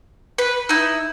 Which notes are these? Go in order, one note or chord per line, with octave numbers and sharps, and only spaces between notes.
B4
D#4 E4